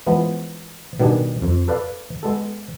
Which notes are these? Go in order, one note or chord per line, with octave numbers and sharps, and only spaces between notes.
E3 F3 G#3 B3
B2 D#3 G3 D4 G#4
F2
A4 B4 D5 F5
G#3 B3 A4